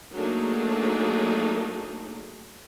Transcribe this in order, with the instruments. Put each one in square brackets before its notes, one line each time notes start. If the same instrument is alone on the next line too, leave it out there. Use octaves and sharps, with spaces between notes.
[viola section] F#3 A3 A#3 D4 D#4 G#4